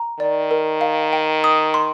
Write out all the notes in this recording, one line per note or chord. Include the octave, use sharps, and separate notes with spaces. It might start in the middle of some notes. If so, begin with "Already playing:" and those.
Already playing: A#5
D#3 D5
A#4
F5
G5
D#6
C6